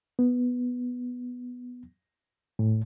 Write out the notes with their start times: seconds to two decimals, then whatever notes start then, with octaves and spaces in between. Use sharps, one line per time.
0.19 B3
2.59 A2